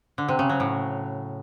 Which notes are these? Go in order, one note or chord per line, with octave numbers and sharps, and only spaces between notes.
D3
C3
C#3
F#3
A2